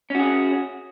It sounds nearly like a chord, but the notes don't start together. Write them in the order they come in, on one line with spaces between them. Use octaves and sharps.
C#4 F#4 G#4